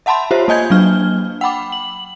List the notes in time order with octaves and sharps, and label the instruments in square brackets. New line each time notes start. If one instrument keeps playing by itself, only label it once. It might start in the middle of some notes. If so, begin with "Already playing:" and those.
[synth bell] E5 F#5 A5 B5 C6
F4 G4 C5 C#5 E5
A#3 D#5 G#5 G6 G#6
F#3 A#3 D4 F6 G7
F#5 G5 B5 D6
F#7